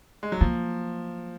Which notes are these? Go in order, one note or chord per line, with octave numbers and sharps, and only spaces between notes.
G#3
F#3
F3 A#3